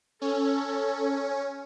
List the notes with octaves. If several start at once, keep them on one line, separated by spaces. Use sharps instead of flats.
C#4 A4